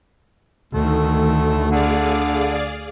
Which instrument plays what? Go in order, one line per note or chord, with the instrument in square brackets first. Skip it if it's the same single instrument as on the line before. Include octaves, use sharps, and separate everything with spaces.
[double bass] D2 [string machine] D#3 [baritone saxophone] A3
[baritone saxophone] D3 [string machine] G#4 D5 F5